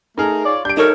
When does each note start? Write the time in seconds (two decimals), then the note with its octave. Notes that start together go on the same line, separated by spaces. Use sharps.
0.18 A3 D#4 G#4 A#4
0.45 F4 C#5 D5
0.65 G3 D4 G6 D7
0.77 D#4 A4 A#4 C#5